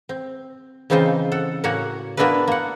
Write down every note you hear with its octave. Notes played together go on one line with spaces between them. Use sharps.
C4
C#3 E3 C4 D#4 F4 C5
A4 F#5
A2 A#3 F#4 C#5 F#5 G#5
A#3 B3 D4 E4 A#4 B4
A#3 F#5